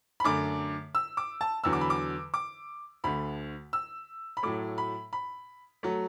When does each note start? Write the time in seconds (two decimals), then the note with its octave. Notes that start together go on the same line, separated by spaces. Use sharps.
0.20 B5
0.24 F#2 D3 A3 D6
0.95 E6
1.17 D6
1.41 A5
1.64 E2 D3 F#3 E6
1.73 D6
1.81 B5
1.90 D6
2.34 D6
3.04 D2 D3 A3 B5
3.73 E6
4.37 B5
4.43 A2 F#3 A3 D6
4.78 B5
5.13 B5
5.83 F#3 A3